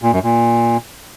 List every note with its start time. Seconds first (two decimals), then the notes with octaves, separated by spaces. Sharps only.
0.02 A#2
0.13 F#2
0.24 A#2